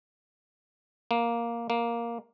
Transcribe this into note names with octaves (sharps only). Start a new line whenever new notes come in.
A#3
A#3